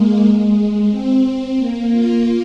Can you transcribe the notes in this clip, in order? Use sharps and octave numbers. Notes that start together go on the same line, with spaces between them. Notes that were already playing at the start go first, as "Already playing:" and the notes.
Already playing: G#3 A#3
G#3
C4
A#3
F4